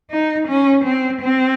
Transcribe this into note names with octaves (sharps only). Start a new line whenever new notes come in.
D#4
C#4
C4
C4